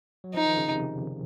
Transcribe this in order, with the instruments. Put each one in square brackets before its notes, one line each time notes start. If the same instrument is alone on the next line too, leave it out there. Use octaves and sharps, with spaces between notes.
[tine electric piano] F#3
[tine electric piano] F3 [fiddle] D#4
[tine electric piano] D#3
C#3
C3